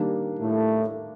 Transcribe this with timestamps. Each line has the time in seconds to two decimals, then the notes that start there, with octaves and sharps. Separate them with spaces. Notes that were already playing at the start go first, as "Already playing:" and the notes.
Already playing: D#3 G3 A#3 D4
0.39 A2 A3